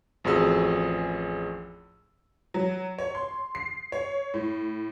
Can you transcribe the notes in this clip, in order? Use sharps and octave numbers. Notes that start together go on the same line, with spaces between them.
A1 F2 F#4 G#4 E6
F#3
C#5
C6
C7
C#5
A2